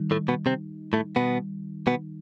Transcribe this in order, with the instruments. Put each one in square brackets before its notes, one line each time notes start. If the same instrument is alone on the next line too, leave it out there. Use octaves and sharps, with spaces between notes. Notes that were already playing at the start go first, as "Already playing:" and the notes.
Already playing: [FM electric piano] D#3 G3 D#4
[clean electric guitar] A2 A3
B2 B3
C3 C4
A2 A3
B2 B3
B2 B3